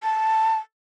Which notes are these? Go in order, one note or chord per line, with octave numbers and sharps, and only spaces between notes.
A5